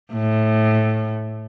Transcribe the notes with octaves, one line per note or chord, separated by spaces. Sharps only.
A2